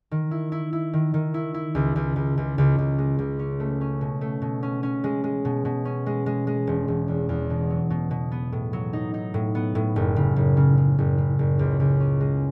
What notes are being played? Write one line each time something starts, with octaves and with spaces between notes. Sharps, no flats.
D#3
E4
E4
E4
D#3
D#3
E4
E4
C#2
C#2
C#2
C#2
C#2
C#2
G#3
C#2
C#4
A3
C#4
B2
A3
B2
C#4
C#4
G#3
G#3
B2
B2
C#4
G#3
G#3
G#3
E1
E1
E2
E2
B2
F#3
B2
B2
B3
A2
F#3
D#4
D#4
A2
B3
A2
F#1
C#3
F#1
C#3
C#3
F#1
C#3
F#1
C#2
C#2
C#4
G#3